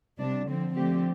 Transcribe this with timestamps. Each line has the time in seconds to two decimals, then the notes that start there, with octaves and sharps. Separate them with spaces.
0.19 C3 G3 D4
0.48 D3 F3 C4
0.76 D3 F3 A3 C4 G4